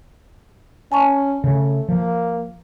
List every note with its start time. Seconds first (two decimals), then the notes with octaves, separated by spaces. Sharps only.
0.92 C#4 G#5 A5 C#6
1.44 C#3 A3
1.89 F3 A#3